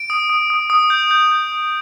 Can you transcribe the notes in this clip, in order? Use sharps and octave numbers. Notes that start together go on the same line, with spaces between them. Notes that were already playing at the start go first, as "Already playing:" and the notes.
Already playing: D7
D#6
D#6
D#6
D#6
G6
G6
G6
D#6